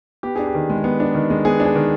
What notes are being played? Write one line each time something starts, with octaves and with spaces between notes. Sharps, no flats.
B3 G4
D4 G#4
G4
D#3
G#3
B3
D4
D#3
G#3
B3 G#4
D4
G#4
D#3